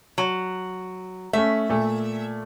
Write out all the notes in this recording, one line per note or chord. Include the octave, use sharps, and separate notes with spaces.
F#3
A3 C#4 E5
A#2 A3